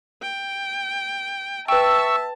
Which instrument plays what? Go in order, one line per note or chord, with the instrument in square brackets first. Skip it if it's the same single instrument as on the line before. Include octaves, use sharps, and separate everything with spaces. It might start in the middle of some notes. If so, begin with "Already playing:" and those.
[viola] G5
[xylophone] B4 G5 [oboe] E5 [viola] A5 [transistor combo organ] C#6 E6